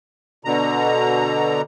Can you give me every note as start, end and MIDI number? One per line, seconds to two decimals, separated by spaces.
0.45 1.61 47
0.45 1.61 50
0.45 1.61 82